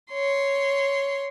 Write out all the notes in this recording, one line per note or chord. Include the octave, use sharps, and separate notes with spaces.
C#5 C6